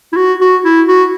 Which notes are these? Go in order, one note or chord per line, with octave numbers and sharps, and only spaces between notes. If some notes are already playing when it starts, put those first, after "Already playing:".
E4
F#4
F#4
E4
F#4